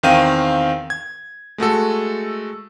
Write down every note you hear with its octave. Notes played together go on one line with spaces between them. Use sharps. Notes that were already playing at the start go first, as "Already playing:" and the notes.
E2 D#3 C4 F5 G5 D#7
G#6
G#3 A3 F#4 A4